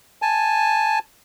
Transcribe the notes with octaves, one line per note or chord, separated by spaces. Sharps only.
G#5 A5